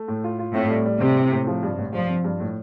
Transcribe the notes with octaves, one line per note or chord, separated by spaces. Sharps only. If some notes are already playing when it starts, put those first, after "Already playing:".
Already playing: A3
A2
F4
F4
A2 C4
G3
G3
C3 C4
A2
A2
F3
G2
A1
G2 F3
C4
G2
A2